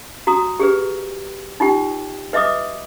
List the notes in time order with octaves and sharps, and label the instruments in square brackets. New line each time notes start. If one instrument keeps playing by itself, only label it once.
[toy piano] F#4 A#5 D#6
G4 G#4 B4
D#4 F4 G4 G5
B4 D#5 E5 D6 D#6